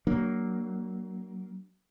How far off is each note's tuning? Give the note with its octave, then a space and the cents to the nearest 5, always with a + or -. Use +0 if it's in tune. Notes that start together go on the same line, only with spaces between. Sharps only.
F#3 +20 A#3 +0 D4 +10